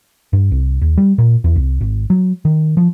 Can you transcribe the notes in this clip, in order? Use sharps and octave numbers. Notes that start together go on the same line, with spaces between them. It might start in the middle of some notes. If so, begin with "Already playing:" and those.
G2
C2
D#2
G3
A#2
E2
C2
G#1
F#3
D#3
F3